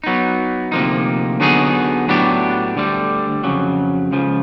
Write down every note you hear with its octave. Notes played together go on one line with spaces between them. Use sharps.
F#3 B3 D#4
D2 C3 F3 A#3 D#4
D3 F#3 B3 D#4 G#4
A2 F#3 B3 D4 G4
D2 D3 G3
F2 C#3 F#3
C#2 C#3 F3